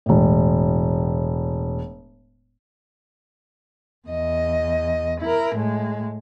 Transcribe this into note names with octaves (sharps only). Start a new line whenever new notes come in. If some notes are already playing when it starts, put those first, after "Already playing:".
E1 A2
E2 D#5
E4 A#4
A2 G#3